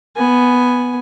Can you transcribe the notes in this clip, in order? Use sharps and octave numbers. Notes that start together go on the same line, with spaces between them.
B3 G#5